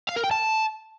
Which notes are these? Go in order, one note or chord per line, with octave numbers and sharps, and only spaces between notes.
F5
A#4
G5
A5